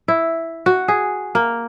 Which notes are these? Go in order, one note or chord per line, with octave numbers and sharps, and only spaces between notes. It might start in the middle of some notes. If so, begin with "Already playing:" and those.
E4
F#4
G#4
A#3